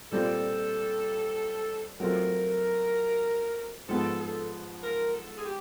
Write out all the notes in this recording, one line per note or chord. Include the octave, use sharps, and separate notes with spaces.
A#2 G3 C4 F4 A4
F#3 A3 C4 F4 A#4
G#2 F3 G#3 B3 A4
A4
A#4
A4
G#4
G4